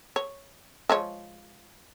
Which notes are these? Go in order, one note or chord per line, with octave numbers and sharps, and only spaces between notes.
C#5
F3 G#3 C#5